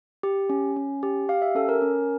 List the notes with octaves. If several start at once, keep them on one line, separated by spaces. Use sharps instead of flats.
G4
C#4
C#4
G4
G4 F5
E5
C#4 A4
A#4
C#4